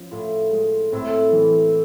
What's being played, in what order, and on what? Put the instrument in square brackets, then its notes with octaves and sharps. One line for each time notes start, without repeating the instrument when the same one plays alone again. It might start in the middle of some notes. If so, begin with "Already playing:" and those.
Already playing: [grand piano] F3 C#4
[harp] A2 [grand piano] F4
[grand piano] G#3
[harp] A2 [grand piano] C4
[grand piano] E3